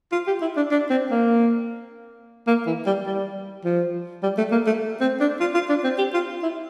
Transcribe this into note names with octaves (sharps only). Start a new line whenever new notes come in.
F4
G4
E4
D4
D4
C4
A#3
A#3
E3
G3
G3
F3
G3
A3
A#3
A3
C4
D4
F4
F4
D4
C4
G4
F4
E4